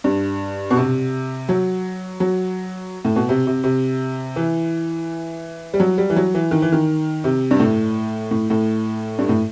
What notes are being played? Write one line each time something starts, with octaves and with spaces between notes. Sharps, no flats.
G2
B2
C3
F#3
F#3
A2
B2
C3
C3
C3
E3
G3
F#3
G3
E3
F#3
E3
D#3
E3
D#3
C3
G2
A2
A2
A2
G2
A2